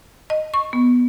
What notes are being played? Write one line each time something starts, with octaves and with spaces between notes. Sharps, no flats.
D#5
C#6
B3